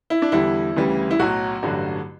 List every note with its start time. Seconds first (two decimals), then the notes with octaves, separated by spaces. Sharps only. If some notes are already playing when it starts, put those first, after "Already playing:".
0.10 E4
0.22 D4
0.32 E2 D3 G3 E4
0.76 D2 C#3 E3 G3
1.11 E4
1.19 B1 A2 F#3 F#4
1.62 A1 G2 D3 F#3